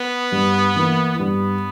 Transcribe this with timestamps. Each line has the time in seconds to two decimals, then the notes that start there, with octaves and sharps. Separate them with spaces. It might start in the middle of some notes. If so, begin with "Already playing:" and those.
Already playing: B3
0.32 G2
0.76 E3 A#3 E4
1.19 G2 B3